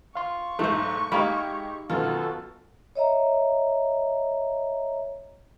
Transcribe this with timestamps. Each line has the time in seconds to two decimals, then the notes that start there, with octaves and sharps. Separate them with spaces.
0.15 F5 C6 C#6
0.59 B1 G#2 A3 C5
1.12 G#3 A#3 D#4 G4 B5
1.90 F#2 B2 D#3 F4 F#4 A4
2.95 C#5 D#5 E5 A#5